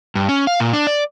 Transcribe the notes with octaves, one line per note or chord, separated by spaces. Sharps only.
G2
C#4
F5
A#2
D4
D5